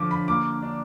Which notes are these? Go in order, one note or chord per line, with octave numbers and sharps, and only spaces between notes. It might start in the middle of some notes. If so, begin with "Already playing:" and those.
Already playing: D3 F3 D6
B5
A#3 D6
D4